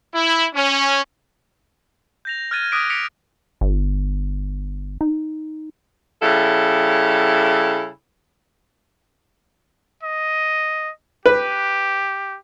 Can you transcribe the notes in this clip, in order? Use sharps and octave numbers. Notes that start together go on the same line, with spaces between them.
E4
C#4
G6 A#6 F7
F6 F#6 G#6 A6 D#7
D6 D#6 F#6 A#6 B6 D7
D6 B6 C#7 D7 F7
G1
D#4
C#3 G3 E4 A4 F5
D#5
G4 B4